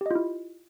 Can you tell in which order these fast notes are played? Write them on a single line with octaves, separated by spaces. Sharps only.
G4 D#5 F4 E4